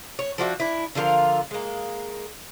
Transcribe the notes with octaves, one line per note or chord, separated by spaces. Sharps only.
C#5
F3 D4 F#4 E5
D4 E4
D3 F3 F4 A#4
G#3 A#3